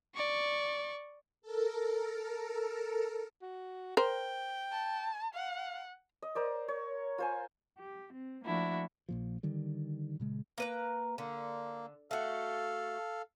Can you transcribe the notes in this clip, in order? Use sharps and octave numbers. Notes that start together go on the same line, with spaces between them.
D5 C#6
A4 A#4
F#4
A#4 C5 G5
A5
F5 F#5
D#5
A#4 C5 D5
C#5
F4 C5 G#5
G4
C4
F3 A3 A#3 D4 E4 F#4
A#1 A#2 F3
D3 D#3 G3
A#2 C#3 G#3
A#3 B4 A#5
D3 A#3
A3 F#4 A4 F5